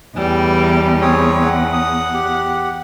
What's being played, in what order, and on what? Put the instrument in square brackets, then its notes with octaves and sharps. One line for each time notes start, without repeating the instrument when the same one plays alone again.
[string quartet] E2 [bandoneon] A2 E3 [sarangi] G3
[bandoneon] C4 G#4 C#5
[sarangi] F#5
[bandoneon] D#6
G4